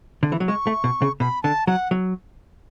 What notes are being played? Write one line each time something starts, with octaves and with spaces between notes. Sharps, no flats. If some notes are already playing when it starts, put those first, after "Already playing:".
D3
E3
F#3
G#3 C#6
A3
B2
C#3
B2 B5
D3 A5
F#3 F#5
F#3